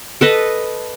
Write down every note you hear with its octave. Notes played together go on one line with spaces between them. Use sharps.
A4 B4 D#5